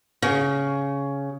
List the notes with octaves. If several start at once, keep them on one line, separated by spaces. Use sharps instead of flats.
C#3